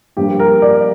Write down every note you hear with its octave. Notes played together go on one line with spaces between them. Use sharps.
G2 F3 A#3 G4
A#4
D5